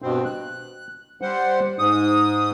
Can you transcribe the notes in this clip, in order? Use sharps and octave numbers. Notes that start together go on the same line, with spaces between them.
G2 B2 C4
F#6
G3 C5 F#5
G#2 D#6